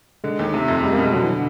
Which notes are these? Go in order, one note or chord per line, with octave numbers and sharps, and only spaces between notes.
D3 G#3
D#2
C3 A3
F2
G3 G#3
A#3
B2 G#3
D3 F#3
E3
D3